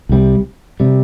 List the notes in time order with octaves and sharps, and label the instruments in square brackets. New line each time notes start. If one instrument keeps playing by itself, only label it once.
[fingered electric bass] C2 C3 G3
C3 G3